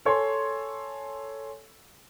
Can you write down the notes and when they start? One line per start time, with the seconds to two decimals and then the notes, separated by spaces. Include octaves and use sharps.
0.05 A4 C#5 G#5 C6